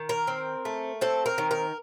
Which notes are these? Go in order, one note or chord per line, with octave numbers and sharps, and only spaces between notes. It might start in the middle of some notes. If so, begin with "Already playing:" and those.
Already playing: D#3
A#4
C4
A3
C4 A4
A#4
D#3
A#4